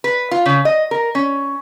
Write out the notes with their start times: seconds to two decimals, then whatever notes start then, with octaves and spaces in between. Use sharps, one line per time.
0.04 B4
0.31 F4
0.46 C#3
0.65 D#5
0.91 A#4
1.15 C#4